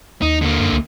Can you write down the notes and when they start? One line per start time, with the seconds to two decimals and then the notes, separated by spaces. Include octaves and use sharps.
0.22 D#2 D#4
0.42 D3 A#3
0.60 F#2
0.72 C#2